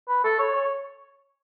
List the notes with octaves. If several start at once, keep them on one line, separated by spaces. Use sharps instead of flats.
B4
A4
C#5
C#5